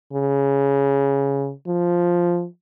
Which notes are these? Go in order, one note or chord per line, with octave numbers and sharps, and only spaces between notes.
C#3
F3